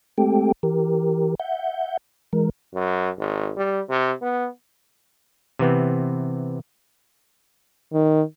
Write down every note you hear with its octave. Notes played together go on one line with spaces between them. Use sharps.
G#3 A3 C4 G4 A4 G5
E3 G4 A#4
E5 F#5 G6
E3 G#3 A#4
F#2
G#1
G3
C3
B3
C3 E3 B3 C4
D#3